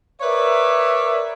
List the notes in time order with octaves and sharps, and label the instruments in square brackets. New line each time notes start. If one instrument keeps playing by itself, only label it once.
[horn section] A#4 B4 C#5 D5 E5